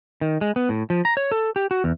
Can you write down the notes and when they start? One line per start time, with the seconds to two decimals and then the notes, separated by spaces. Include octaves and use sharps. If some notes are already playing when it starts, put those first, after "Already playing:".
0.21 D#3
0.41 G#3
0.56 B3
0.69 A2
0.90 F3
1.05 A#5
1.17 C#5
1.32 A4
1.56 G4
1.71 F#4
1.84 E2